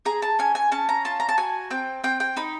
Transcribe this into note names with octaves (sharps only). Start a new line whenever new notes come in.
G#4 A#5
A5
C#4 G#5
G#5
C#4 A5
A#5
F4 A5
A#5
A5
F#4 G#5
C4 G5
C4 G5
G5
D#4 B5